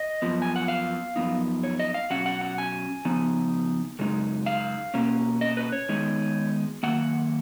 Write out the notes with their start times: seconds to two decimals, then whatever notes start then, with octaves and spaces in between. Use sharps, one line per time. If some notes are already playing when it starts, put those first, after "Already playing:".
Already playing: D#5
0.22 F#2 F3 B3
0.42 G#5
0.56 F#5
0.68 F5
1.16 F#2 F3 B3 D#4
1.63 C#5
1.80 D#5
1.94 F5
2.10 B2 F#3 C#4 F#5
2.26 F#5
2.41 F#5
2.58 G#5
3.05 C#3 F3 B3 D#4
3.99 F#2 C#3 G#3 D#4
4.46 F5
4.94 B2 A#3 C#4
5.41 D#5
5.57 B4
5.72 C#5
5.89 D#3 G#3 B3 D#4
6.83 F#2 D#3 A#3 F#5